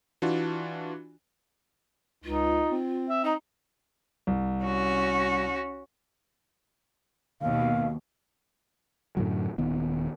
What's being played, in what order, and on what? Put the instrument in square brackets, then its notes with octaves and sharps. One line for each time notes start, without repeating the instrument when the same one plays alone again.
[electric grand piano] E3 D4 F4 F#4
[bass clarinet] C#2 [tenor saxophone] D#4 [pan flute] F4
[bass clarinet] C4
[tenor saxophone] E5
[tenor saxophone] D#4 [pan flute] A#5
[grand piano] C2
[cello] C#4 F#4
[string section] D#2 B2 [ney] F5
[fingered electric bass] F#2 A2 D3 F#3
D#1 D#3 B3